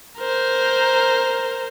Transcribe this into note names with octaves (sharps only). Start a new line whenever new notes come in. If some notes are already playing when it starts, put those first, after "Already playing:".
A#4 C5